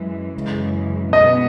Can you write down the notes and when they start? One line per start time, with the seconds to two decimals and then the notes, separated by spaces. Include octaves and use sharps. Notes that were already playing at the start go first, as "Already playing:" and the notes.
Already playing: F#2 E3 G#3
0.34 F#2 C#3 E3 G#3
1.13 B2 G#3 B3 D#5